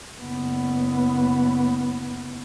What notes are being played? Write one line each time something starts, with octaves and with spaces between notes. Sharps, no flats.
F#1 B3